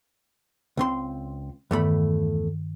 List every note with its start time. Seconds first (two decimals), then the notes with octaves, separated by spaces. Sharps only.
0.77 C#2 C4 C6
1.71 E2 G2 D#3 A3 B5